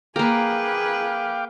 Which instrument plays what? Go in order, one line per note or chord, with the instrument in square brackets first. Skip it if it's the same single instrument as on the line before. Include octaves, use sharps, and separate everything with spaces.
[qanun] A#3 A#4 [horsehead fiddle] G#4 B4 [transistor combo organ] F5 G5 D6